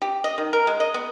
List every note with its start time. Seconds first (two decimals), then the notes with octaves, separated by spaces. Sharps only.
0.02 G4
0.24 D#5
0.38 D#3
0.53 A#4
0.67 G#3
0.80 D#5
0.94 B3